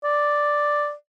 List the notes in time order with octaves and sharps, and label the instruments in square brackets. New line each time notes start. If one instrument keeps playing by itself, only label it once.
[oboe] D5